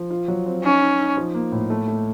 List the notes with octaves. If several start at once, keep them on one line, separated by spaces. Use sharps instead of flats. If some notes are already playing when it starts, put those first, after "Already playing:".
Already playing: F3
F4
F#3
C4
C#4 D#4
D#4
D#4
F3
A#3
A2
A3
A3